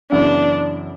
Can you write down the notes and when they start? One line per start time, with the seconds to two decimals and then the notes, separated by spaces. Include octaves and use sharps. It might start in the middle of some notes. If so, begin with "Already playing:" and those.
0.11 F#2 C#3 E3 B3 D4